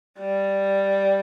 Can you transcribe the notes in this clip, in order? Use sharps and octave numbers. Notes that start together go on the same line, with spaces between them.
G3